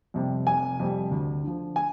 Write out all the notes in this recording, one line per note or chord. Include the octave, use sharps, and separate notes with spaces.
F2 C3 G3
F1 G#5
F2 C3 G3
D2
D3 F3
G#5